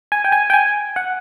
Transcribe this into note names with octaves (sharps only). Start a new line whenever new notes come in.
G#5
G5
G#5
G5
G#5
F#5